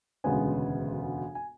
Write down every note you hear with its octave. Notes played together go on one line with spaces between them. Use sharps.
E1 D2 C#3 G#3 B3 G#5
G#5